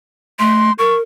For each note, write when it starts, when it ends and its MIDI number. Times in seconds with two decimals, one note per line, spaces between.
0.39 0.70 57
0.39 0.73 84
0.79 1.01 70
0.79 0.95 85